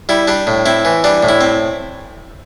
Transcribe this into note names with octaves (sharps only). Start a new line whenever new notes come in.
G3 E4
G3 D4
A2
C4 E4
E3
G3 D4
A2
E4
C4